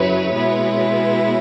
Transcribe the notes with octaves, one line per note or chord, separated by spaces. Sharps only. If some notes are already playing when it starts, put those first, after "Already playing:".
Already playing: F#2 C#3 F#3 E4 B4 C#5
B2 G#3 B3 E4